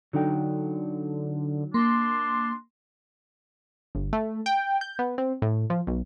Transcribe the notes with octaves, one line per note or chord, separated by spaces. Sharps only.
D3 F#3 D#4 G5
A#3 D4 C6
G1
A3
G5
G6
B3
C4
A2
F3
B1